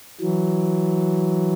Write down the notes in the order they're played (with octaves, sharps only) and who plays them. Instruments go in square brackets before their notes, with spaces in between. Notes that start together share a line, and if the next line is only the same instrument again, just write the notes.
[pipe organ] E3 F#3